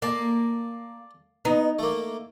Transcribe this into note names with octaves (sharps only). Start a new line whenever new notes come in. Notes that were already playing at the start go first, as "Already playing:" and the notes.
A#3 D5 A5
B3 D#4
A3 A#3